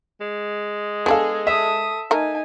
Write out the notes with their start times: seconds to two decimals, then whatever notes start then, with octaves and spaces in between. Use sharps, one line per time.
0.21 G#3
1.06 B3 D4 G#4 A4 F5
1.47 A4 E5 D#6
2.11 A3 D#4 A4 A#4 G#5